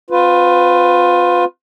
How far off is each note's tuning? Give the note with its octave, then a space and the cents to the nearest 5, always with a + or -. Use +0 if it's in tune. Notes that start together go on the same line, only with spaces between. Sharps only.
C4 +0 F4 +25 B4 +30